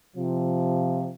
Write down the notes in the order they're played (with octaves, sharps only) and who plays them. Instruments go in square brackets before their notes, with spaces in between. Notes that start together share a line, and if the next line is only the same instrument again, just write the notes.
[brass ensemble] C3 F3